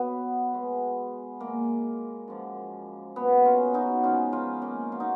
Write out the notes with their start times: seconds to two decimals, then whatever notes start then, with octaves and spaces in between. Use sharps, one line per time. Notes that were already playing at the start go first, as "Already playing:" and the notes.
Already playing: B2 F#3 B3
0.53 B2 G#3
1.40 A#2 G#3 A#3
2.28 F#2 F3 G#3
3.16 A#2 F#3 B3
3.45 C#4 F4
3.74 D#4 F#4
4.03 G#2 F3 G#3 C#4 F4
4.33 C#4 F4
4.62 A#3 C#4
4.92 F#3 F4
5.00 D#4